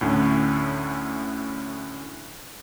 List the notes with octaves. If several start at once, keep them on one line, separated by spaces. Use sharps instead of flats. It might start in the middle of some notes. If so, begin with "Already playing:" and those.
D2 A2 D3 C#4